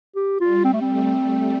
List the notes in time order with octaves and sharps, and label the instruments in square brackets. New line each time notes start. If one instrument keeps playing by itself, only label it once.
[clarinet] G4
[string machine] G3 [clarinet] F4
[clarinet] C4
A3
C4
[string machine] A3